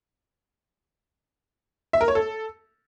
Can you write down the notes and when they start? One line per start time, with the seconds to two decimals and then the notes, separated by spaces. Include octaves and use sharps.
1.93 E5
2.01 A#4
2.08 C#5
2.15 A4